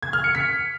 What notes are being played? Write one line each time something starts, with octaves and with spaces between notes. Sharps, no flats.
G#6
F6
C#7
B6